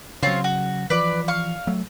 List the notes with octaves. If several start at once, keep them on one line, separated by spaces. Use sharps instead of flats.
C#3 F#3 C4 F4 C#5
F#4
E3 F3 B4 D5
F5 C#6
F#3 A3